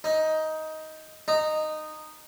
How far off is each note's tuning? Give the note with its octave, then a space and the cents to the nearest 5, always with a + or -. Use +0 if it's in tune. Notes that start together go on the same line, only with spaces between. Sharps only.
D#4 +10
D#4 -15